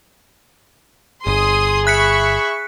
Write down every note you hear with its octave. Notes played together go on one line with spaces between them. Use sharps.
G1 G#4 C6 D#6
E5 B5 C#6 F#6 B6 C#7